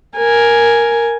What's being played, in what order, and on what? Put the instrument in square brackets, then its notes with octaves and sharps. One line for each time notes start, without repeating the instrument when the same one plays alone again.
[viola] A#4 G#5